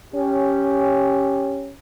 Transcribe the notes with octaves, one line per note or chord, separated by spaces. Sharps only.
C#4 G4